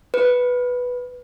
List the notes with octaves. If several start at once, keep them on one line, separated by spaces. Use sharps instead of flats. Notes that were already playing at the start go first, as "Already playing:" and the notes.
B4